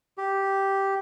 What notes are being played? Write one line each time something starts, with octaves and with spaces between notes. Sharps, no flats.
G4